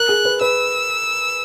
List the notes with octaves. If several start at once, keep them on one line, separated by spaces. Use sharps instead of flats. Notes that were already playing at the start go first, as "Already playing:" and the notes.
Already playing: A#4 F#6
G#4
B4
B4 E6